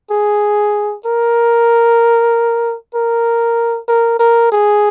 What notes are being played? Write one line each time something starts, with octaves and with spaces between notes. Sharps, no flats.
G#4
A#4
A#4
A#4
A#4
G#4